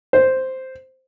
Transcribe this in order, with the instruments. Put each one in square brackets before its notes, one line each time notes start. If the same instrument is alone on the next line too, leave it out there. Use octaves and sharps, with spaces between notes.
[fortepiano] C5